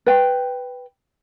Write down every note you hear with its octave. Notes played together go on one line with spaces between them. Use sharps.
B4 G5